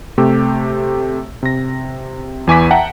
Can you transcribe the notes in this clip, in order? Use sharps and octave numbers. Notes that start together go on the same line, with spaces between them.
C3 A3 G4 E6
C3 A#6
E2 E3 G#5 C#6 D6 B6
E5 F#5 G5 A5 A#5